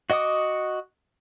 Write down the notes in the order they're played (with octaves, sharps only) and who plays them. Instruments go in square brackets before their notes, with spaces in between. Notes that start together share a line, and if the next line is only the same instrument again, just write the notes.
[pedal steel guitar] F#4 D#5 F#5 D6 D#6